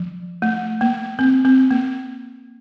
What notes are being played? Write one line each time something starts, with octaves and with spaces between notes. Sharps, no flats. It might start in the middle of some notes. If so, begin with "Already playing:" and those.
Already playing: F3
A3
A#3
C4
C4
A#3